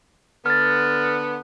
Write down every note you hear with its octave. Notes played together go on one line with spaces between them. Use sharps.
D3 B3 F6 A6